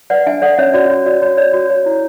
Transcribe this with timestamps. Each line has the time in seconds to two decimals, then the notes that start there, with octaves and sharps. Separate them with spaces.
0.10 B4 D5 F#5
0.27 D4 E5 G#5
0.42 A4 D5 F#5
0.58 C#4 C#5 E5
0.74 F#4 D5
0.90 F#4 C#5
1.06 F#4 D5
1.22 F#4 C#5
1.37 C#5 D5
1.53 F#4
1.70 C#5
1.86 E4